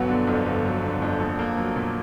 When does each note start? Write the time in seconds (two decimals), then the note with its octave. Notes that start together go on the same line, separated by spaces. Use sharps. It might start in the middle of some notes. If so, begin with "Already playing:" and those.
Already playing: G1 F#3 B3
0.08 D3
0.27 F2
0.46 G1
0.65 F#3
0.84 D3
1.02 F2
1.20 A#1
1.39 A#3
1.57 F#3
1.76 A#2